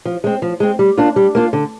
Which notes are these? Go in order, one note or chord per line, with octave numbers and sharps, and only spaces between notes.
F3
G#3 C4
F3
G#3 C4
G3
A#3 D4 F4
G3
A#3 D4 F4
D3